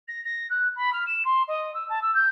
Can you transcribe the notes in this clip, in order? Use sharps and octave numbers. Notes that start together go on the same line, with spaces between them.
A#6
A#6
F#6
B5
F6
E7
C6
D#5
E6
A5
E6
G6